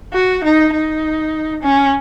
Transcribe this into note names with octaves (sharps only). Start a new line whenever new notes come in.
F#4
D#4
D#4
C#4